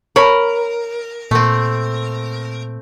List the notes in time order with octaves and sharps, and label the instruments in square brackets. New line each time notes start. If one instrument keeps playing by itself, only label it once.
[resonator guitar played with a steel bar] A#4 [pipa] C#5 B5
[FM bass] A#2 [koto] A3 C4